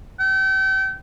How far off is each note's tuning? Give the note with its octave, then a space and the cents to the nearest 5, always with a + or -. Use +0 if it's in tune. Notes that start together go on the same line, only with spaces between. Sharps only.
G5 -35